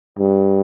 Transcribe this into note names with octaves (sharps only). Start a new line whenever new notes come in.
G2